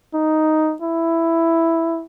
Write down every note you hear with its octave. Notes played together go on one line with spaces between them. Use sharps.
D#4
E4